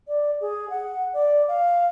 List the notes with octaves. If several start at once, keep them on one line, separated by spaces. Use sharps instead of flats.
D5
G#4
F#5
D5
F5